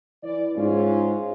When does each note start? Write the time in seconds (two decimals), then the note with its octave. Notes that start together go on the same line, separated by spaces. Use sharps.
0.23 E3 D5
0.56 G#2 C#4 F4